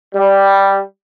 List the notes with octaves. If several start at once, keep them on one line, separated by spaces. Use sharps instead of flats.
G3